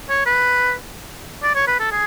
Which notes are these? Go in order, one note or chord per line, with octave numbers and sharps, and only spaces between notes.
C#5
B4
D5
C#5
B4
A4
G#4